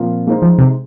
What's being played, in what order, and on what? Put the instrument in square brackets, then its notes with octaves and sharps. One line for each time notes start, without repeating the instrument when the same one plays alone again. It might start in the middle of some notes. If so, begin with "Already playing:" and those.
Already playing: [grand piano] A#2 F3 C4 F4 A#4
[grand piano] G#3 D#4 C5 [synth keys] A#3
[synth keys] F3
C3